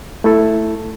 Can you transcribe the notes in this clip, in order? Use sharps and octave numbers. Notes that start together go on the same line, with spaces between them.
A3 E4 A4